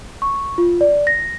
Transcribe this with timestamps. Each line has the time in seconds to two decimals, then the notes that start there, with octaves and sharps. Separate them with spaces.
0.22 C#6
0.58 F4
0.81 D5
1.07 A#6